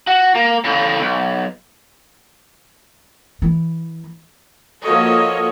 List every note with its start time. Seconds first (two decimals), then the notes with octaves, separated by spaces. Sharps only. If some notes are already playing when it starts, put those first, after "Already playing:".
0.07 F#4
0.35 A#3
0.64 A2 C#3
1.01 B1
3.42 E3
4.83 F3 A#3 F#4 A4 C#5 D#5